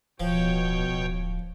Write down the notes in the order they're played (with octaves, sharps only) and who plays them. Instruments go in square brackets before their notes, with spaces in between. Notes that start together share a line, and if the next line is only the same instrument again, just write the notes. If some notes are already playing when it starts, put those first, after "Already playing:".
[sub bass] D1 [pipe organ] B2 C#5 G5 [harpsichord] F3
[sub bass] D1